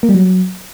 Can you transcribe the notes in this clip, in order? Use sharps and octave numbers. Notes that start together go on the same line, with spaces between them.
A#3
G3
F#3